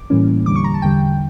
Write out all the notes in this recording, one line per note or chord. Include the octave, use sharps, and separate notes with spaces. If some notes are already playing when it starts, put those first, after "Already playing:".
Already playing: D6
A2 E3 G3 A#3 C#4
E2 D3 G3 D6
C#6
A#5
A5
E2 D3 G3 G5